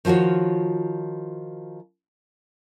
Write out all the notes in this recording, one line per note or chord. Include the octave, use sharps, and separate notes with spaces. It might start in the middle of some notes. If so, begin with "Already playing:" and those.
D#3 F3 F4 F#4 C#5